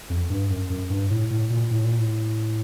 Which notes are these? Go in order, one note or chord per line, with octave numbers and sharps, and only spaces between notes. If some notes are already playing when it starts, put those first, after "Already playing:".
F2
G2
F#2
F#2
G2
A2
A2
A#2
A2
A#2
A2